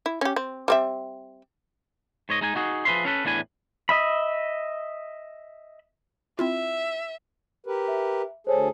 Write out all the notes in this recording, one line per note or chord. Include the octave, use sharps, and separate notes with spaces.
E4
C#4 G4
C4
G3 C4 E5
G#2 C#5 D#5
G#3 D#4 G#5
D#4 F#4 G#4
F3 G#4 B4 C#5 E5 C6
C#4 A4 B4
E2 A2 D4 E4 G#5
D#5 E5 B5
C4 E4 F4 E5
G4 A#4 B4
E5
D2 G#4 A4 C5 C#5